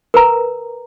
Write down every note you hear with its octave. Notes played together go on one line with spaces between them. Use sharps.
A#4 B4 A#5